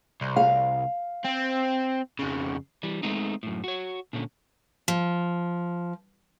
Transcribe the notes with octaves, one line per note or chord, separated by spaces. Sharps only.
C2
F5
C4
F2 C#3
E3 G3
G#3 A3 B3 C4 D#4
F#2 A2
F#4 C#5
A#2 D3 C#4
F3